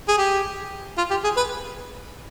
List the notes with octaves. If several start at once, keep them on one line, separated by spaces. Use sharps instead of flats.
G#4
G4
F4
G4
G#4
B4